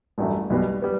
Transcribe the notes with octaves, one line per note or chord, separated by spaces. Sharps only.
A1 G2 F#3 A3 E4
B1 B2 G3
G3 B3